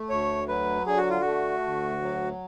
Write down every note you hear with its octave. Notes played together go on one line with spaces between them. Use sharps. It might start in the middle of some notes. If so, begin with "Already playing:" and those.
Already playing: A3
D2 C#5
F#3 B4
D3 G#4
F#4
F4
A3 F#4
D2
F#3